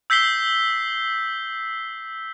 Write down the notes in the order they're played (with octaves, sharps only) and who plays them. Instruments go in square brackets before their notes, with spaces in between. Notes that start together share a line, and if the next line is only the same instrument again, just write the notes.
[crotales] E6 G6 B6 C7 G7